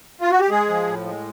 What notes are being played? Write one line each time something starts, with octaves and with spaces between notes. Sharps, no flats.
F4
F#4
G4
G#3 G#4
F3
A2
G#3